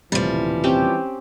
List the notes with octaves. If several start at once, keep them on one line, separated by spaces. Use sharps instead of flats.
D#1 A2 C3 E3 F3 G3
C4 C#4 G4